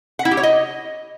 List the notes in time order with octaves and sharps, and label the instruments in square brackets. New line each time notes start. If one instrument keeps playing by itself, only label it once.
[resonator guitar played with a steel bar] F#5
E4
G4
C#5
D#5